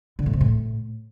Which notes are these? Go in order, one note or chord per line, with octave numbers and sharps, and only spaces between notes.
D3
A2
C3
A2